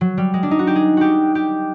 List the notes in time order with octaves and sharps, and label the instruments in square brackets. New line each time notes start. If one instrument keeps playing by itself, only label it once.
[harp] F#3
G3
G#3
D4
D#4
F#4
G4
G#4
F#4 G4
G4